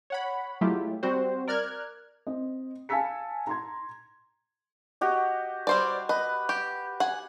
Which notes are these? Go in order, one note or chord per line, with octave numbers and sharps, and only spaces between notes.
C#5 F#5 B5
F#3 G#3 A3 E4 F4 G4
G3 C4 F#4 C5
A#4 D5 F6 F#6 G#6
C4 D#5
F5 G#5 A5 E6 B6 C#7
A#5 C6 G#6
F#4 G4 D#5
G3 C5 D5
B4 D#5
G4
F#5 G#5